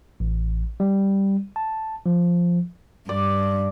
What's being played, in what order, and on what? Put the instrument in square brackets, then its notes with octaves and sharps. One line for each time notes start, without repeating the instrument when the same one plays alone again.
[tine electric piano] A1
G3
A5
F3
[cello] G2 [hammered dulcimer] D5